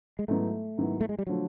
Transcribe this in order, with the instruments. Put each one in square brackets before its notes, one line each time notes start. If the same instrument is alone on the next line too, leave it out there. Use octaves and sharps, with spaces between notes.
[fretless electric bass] G#3
[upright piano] G#2 D#3 F#3 B3 E4 [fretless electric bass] A3
[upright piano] G#2 D#3 F#3 B3 E4
[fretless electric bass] A3
G#3
G3
[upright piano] D3 F3 A3 [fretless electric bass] F#3